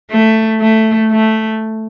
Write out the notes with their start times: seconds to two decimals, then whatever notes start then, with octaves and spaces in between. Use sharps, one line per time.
0.11 A3
0.61 A3
1.12 A3